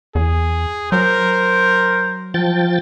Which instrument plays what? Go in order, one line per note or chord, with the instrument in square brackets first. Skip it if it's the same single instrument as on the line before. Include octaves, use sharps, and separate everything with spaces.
[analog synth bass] E2 [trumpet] G#4
[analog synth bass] F#3 [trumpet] A#4 [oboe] C5
[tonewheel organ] F3 G5 A6